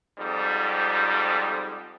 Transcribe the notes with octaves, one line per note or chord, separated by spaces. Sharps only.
F2 G#2 G3